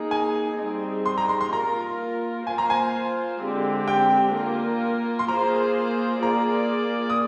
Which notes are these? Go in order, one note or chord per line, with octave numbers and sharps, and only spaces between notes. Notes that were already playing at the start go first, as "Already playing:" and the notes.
Already playing: A#3 D#4 G#4
G#5
G3 C4 D#4 G#4
C6
A#5
C6
C6
A#3 F4 A#4 A#5
A#3 F4 C5 G#5
A#5
G#5
D3 G#3 C4 G4
G5
A#3 F4 A#4
C6
A#3 F4 G#4 C5 A#5
A#3 F4 G#4 D5 A#5
D#6